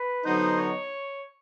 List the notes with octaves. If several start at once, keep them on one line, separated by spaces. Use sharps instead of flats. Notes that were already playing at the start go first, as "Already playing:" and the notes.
Already playing: B4
D3 F#3 B3 D#4 C5
C#5